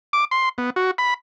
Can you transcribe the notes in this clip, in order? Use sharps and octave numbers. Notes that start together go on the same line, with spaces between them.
D6
C6
B3
F#4
B5